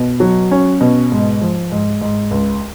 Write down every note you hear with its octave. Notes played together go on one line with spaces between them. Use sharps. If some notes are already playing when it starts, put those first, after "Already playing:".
Already playing: B2
F#3
C#4
B2
G#2
F3
G#2
G#2
C#2